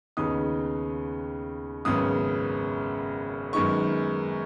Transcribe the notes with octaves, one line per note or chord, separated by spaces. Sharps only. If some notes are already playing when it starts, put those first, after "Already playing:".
D#2 C#3 B3 D#4 D#6
G#1 F#2 C#3 B3 D#6
F#2 D#3 G#3 B3 C#6